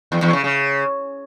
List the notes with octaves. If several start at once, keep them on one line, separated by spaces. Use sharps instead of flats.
E2
E2
C#3
C#3